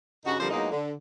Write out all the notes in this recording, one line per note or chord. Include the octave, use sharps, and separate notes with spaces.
G2 C#3 D#4 F#4
F2 D3 F3 G3 A#4 C5
E2 F#3 G#3 A#3 D#4
D3